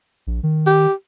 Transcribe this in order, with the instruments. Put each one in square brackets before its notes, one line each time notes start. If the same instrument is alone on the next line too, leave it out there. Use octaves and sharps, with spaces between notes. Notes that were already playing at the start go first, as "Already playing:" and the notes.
[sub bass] A#1
D#3
[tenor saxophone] G4